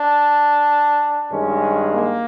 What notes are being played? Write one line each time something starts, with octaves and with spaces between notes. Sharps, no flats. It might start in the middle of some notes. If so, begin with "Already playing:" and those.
Already playing: D4
G2 D#3 G#3 C#4
A#3